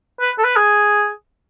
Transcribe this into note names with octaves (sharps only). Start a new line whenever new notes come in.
B4
A4
B4
G#4